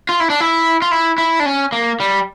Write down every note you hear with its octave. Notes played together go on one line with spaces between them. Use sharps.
F4
E4
D4
E4
F4
E4
E4
D4
C#4
A#3
G3